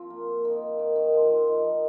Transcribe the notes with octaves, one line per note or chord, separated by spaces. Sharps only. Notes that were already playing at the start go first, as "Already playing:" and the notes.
Already playing: F3 C4
A#3
D#3
D#3
D#3
F3
D#3 F3
D#3
D#3